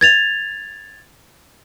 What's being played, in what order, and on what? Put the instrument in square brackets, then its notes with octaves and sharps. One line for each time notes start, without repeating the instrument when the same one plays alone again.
[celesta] G#6 A6 F7